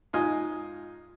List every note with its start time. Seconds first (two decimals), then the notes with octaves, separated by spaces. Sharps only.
0.13 G#2 F4 D#5 G#5